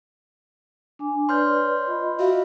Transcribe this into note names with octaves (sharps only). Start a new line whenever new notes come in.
D4 G#5 D6
B4 C#5 D5 C6 F6 G6
F4 D#5 B5
F#4 E5 F5